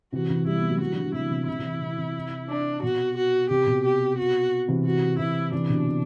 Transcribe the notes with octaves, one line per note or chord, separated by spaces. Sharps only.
C3 E3 F#4
C3 E3
E3 G3 E4
G3 B3
F#3 A3
E3 G3 F#4
D3 F#3
D3 F#3
C3 E3 E4
C3
C3 E4
C3 E3
C3
C3
D4
B2 F#4
F#4
C3 G4
B2
G4
F#4
C3 E3
F#4
C3 E3 E4
C3 E3 D4
B2 D3
C3